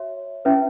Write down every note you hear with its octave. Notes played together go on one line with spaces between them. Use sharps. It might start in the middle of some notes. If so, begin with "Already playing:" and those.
Already playing: F#4 C#5 E5
C#4 E4 B4 E5